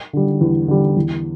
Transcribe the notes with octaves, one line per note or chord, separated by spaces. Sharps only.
D3 G3
E2
D3 G3
E2